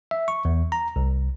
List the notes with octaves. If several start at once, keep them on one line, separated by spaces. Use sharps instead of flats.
E5
C#6
E2
A#5
C2